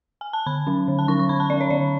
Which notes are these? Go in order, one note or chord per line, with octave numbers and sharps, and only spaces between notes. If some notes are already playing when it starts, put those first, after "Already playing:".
G#5
A5
D3 B5
F#3 C#4
D3
A5
F#3 C#4 C#6
C#6
D3 B5
A5
F#3 C#4 D5
C#5
D3 D5